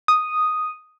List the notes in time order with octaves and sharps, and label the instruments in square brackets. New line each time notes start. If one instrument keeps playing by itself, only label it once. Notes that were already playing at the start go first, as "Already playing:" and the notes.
[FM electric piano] D#6